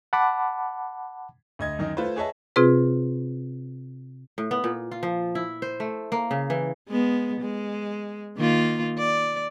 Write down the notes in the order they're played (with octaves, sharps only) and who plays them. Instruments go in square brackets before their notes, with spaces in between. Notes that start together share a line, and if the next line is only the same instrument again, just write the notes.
[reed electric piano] F#5 A5 B5 D6
[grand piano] D2 D#5 G#6
F#2 D#3 D#5
A3 F4 B4 C5
G#4 B4 C#5 D#5 E5 A5
[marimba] C3 C4 F4 G#4 B4
[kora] A2
B3
A#2
F4
F3
E4
C5
A3
A#3
C#3
E3
[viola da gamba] G#3 B3
G#3
D#3 A#3 F4
D5